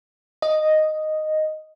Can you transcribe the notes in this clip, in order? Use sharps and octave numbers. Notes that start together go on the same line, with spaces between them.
D#5